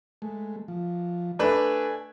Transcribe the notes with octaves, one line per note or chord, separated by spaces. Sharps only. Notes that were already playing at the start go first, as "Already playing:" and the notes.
G#3 A3
F3
A3 D4 B4 G#5